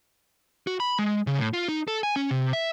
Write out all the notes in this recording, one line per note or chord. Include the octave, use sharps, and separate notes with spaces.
F#4
B5
G#3
C#3
A2
F4
D#4
A4
G#5
C#4
C3
E5